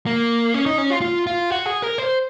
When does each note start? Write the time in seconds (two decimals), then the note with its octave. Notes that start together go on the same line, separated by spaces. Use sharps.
0.06 A#3
0.54 C#4
0.66 D#4
0.78 C#4
0.90 F4
1.02 F4
1.27 F4
1.51 F#4
1.66 G#4
1.82 A#4
1.98 C5